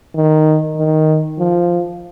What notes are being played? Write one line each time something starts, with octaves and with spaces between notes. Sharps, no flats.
D#3
D#3
F3